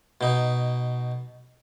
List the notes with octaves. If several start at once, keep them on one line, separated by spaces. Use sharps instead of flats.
B2 D#4